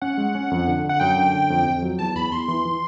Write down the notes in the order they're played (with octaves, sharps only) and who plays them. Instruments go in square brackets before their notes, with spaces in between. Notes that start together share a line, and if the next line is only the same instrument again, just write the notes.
[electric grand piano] C#4 [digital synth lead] F#5
[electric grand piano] G#3
C#4
F2
D3
[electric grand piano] D3 [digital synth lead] F#5
[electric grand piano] F#2 [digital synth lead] G5
[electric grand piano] D3
D3
F2
F2
F#3
[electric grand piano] E2 [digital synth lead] A5
[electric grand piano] E2 [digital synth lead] B5
[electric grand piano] E2 [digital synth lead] C6
[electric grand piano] E3 [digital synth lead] C6
[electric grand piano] E3